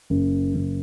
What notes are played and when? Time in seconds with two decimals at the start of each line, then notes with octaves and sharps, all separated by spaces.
0.10 F#1
0.55 F#1